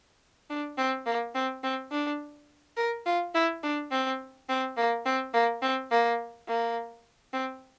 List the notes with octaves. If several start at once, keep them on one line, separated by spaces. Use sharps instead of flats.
D4
C4
A#3
C4
C4
D4
A#4
F4
E4
D4
C4
C4
A#3
C4
A#3
C4
A#3
A#3
C4